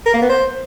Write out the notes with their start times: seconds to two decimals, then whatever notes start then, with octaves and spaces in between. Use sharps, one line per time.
0.06 A#4
0.14 A#3
0.22 B3
0.30 C5